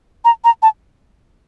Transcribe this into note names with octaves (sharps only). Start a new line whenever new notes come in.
A#5
A#5
A5